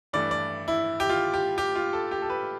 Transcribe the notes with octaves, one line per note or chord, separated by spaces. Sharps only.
G2 E3 A3 D5
D5
E4
G4
F4
G4
G4
F4
A4
G4
A4
B4